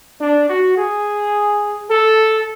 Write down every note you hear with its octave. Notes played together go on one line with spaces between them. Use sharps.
D4
F#4
G#4
A4